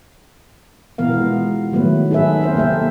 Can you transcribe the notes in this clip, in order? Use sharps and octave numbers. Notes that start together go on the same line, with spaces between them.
B2 E3 B3 A#4 F5
G#3 F4
D#3 F#3 A3 B3 B4
D#4 G#4 A4 B4 E5
C4 A#4 C5
C3 A#3 A4 E5